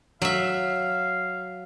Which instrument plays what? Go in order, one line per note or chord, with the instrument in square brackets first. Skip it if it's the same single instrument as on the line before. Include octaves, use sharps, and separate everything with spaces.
[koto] F#3 E5 [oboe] F5